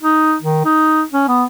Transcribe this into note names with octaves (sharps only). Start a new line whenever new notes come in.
D#4
D#3
D#4
C#4
B3